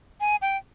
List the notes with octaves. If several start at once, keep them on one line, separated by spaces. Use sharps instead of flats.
G#5
G5